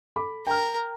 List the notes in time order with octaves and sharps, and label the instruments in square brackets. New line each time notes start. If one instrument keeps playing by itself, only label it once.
[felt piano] A4 B5 D6
[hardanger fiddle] A#4 [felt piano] G5 A#5 F6